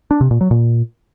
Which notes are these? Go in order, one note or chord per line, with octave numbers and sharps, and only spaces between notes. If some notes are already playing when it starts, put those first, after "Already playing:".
D4
C3
A#2
F#3
A#2